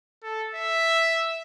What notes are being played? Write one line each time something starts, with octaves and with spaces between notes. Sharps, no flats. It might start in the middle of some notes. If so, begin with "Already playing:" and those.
A4
E5